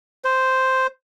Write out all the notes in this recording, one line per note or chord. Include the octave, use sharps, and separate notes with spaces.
C5